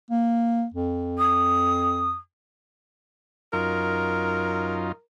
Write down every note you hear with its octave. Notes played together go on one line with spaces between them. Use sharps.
A#3
F2
D#6
F#2 D#4 F4 A#4